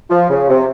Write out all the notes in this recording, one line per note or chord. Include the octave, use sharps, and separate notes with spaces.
F3
C#3
C3